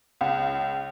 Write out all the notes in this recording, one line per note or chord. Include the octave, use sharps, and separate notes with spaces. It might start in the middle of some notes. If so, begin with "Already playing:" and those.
C#2